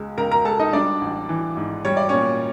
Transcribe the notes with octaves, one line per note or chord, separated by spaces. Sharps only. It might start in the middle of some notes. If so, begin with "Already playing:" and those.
Already playing: C#2 G#3
C#2 A#4 A#5
A#4 A#5
G#3 A4 A5
D#4 D#5
G3 D4 D5
A1
E3
G#2
G3 C#5
D5
A#2 C#4 C#5